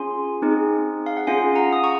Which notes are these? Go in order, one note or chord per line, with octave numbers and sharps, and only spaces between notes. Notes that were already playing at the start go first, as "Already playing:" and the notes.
Already playing: C#4 F4 G#4 G#5 C6
C4 D#4 G#4
F5
F#5
C#4 F4 G#4 F5 G#5
F#5 A#5
D#6
A#5 C#6